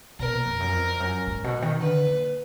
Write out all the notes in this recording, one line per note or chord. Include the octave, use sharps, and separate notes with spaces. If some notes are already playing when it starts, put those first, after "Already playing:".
B2 A#4
A#2
F2
F#2
F2
F#2
G#2
B2
D#3
D3 B4
A#2